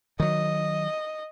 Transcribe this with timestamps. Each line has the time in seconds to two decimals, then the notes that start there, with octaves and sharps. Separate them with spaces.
0.20 D#3 F#3 D#5